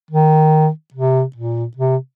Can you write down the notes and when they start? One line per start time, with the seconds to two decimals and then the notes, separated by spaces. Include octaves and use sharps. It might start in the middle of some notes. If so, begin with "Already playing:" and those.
0.11 D#3
0.94 C3
1.36 A#2
1.77 C3